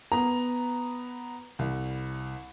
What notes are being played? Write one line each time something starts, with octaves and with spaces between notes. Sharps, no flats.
B3 A#5
C2